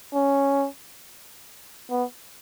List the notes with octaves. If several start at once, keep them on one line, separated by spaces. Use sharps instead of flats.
C#4
B3